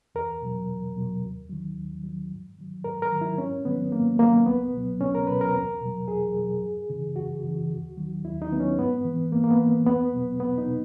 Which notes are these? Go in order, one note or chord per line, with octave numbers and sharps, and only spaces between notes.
E2 A#4
B2 F#3
E2
B2 F#3
D#2
D#3 F#3
D#2
D#3 F#3
G#2
D#3 F#3
G#2 A#4
A#4
D#3 F#3
E4
G#2 C#4
D#3 F#3 B3
G#2 A#3
D#3 F#3 A#3
C#2 B3
B2 F#3
C#2 C#4
A#4
B2 F#3 B4
A#4
E2
B2 F#3
E2 G#4
B2 F#3
F#2
C#3 E3
F#2 F#4
C#3 E3
D#2
D#3 F#3
D#2 E4
D#4
D#3 F#3 B3
C#4
G#2 B3
E3
G#2 A#3
A#3
B3
E3
E2 B3
B2 F#3
E2 B3
D#4
B2